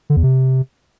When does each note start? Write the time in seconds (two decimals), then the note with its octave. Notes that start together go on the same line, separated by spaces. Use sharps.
0.10 D3
0.16 E2
0.23 C3